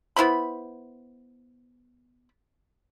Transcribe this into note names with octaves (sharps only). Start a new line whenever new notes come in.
B3 E4 C5 B5